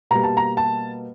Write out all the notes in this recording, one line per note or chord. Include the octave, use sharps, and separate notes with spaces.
B2 G3 A#3 A#5
A5
A#5
A5